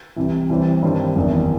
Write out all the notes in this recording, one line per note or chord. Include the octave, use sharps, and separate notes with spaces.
C2 C3 E3
C2 C3 E3 G3 C4
G2 D#3 G3 C4 E4
F#1 E2 D#3